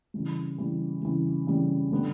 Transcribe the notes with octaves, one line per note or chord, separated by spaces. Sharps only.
C#3 E3 G3
C#3 E3 G3
C#3 E3 G3
C#3 E3 G3
D3 G3 B3